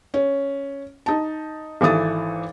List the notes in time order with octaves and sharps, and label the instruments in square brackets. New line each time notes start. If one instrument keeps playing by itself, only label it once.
[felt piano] C#4
D#4 A5
G#1 E3 A4 D#6 A6